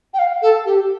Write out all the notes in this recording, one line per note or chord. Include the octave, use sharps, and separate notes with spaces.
G5
F5
A4
G4